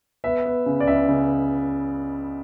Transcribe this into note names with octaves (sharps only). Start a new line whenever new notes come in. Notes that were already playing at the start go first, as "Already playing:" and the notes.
B3 E5
B3
C#3
D5
C#2 E5
C#3